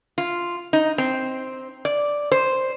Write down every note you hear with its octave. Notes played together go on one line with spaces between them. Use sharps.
F4
D#4
C4
D5
C5